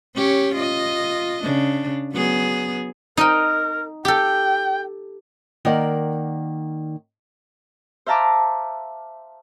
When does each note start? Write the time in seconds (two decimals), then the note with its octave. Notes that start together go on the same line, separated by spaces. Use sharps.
0.15 C#4 G4 C#5
0.54 F4 D#5
1.43 C#3 D4
2.12 F#3 B3 G#4
3.17 D#4 A#4 D#5 G5
4.05 G4 A4 G5
5.65 D#3 A#3 D5 F#5
8.06 C5 E5 F5 A5 A#5 D6